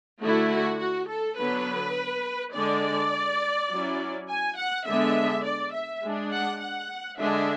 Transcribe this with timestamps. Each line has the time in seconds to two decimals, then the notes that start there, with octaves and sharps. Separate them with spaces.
0.21 D3 A3 E4 F#4
0.51 F#4
0.79 F#4
1.08 A4
1.38 D3 F#3 B3 B4
2.53 D3 G#3 D4 D5
3.70 F#3 C#4 E4
4.29 G#5
4.57 F#5
4.86 D3 G#3 B3 D4 E5
5.44 D5
5.73 E5
6.02 G#3 D4
6.32 F#5
6.60 F#5
7.18 D3 G#3 D4 E5